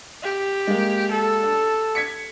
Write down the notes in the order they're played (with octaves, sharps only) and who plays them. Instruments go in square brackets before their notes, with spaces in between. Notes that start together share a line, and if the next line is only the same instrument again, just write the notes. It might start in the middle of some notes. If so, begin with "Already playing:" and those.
[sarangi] G4
[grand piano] G#3 A#3
[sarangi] A4
[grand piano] D4
G#6 B6 C#7